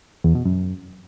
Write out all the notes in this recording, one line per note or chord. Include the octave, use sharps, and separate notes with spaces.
E2
B2
F#2